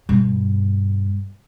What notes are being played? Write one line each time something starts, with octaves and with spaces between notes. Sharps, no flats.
G2 B2